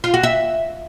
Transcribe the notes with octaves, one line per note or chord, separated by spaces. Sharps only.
F4
F#4
E5